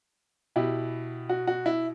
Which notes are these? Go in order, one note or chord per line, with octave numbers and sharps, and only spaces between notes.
B2 E4 G4
F#4
F#4
E4